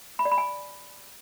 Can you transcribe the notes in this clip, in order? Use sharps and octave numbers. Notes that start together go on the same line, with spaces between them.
B5
D5
B5
G#5